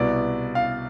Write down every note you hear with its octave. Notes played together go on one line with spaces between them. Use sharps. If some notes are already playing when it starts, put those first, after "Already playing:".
Already playing: C2 B2 B3 E4 D5
F5